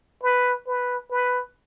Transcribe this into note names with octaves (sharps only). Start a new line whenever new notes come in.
B4
B4
B4